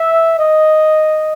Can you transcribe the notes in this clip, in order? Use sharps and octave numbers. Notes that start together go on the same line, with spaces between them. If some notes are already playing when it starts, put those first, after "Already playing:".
Already playing: E5
D#5